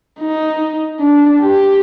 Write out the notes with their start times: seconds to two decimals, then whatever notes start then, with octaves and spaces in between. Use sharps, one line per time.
0.21 D#4
1.01 D4
1.42 G4